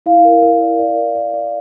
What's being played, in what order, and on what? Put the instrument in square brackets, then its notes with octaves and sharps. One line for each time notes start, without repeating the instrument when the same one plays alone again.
[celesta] E4 F5
A#4
A#4
D5
D5
D5
D5
D5